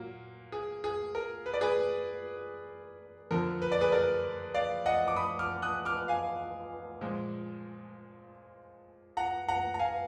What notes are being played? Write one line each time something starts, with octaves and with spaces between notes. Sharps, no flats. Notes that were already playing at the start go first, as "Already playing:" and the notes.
Already playing: A#2 F#3 A#3
G#4
G#4
A#4
B4
D5
G#4 B4
F2 D3 F3 A#4
B4
D5
G#4 B4
A#4 D5
D5 F5
D#5 F#5
D6
B5 D#6
D6 F6
D#6 F#6
D6 F6
F5 G#5
A#2 F3 G#3
F#5 A#5
F#5 A#5
A#5
F5 G#5